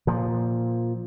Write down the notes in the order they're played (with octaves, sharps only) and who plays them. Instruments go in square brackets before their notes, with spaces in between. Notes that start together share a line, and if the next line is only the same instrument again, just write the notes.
[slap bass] A#2 F3